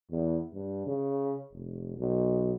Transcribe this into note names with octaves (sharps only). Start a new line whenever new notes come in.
E2
G2
C#3
F1
B1